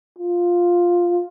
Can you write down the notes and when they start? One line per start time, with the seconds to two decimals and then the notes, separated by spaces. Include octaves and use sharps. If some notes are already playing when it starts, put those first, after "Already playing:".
0.18 F4